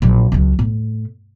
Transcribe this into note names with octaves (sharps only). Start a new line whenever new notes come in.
A#1 F#3
C#2 F#3
A2